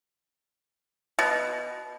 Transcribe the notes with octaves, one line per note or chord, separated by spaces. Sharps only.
B2